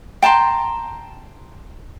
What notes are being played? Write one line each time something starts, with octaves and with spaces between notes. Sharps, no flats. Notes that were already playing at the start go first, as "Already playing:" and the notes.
G5 A5 A#5 C6